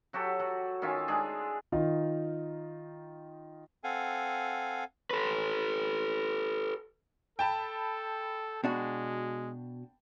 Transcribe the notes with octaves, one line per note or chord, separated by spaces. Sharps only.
F#3 F#4 G4 A4
F#3
D#3 C#4 F4 E5
G#3 D4 G#4
D#3 D#4 F4
C4 A4 F5 F#5 G#5
A4 B4
A4 G5 A5 B5
B2 G#3 D4 F#4